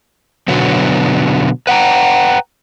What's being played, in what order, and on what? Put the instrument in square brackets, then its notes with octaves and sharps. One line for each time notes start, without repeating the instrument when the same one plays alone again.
[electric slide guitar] B2 D3 F#3 B3
B4 F#5 G5 A#5